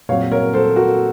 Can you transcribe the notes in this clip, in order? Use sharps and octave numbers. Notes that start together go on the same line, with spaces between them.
A#2 F#3 C4 C#5 F5
A#4 C#5
A4 C5
F#4 A#4